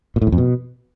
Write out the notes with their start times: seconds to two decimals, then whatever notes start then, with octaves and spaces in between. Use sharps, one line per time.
0.16 A#2
0.22 A2
0.27 E2
0.32 F2
0.38 B2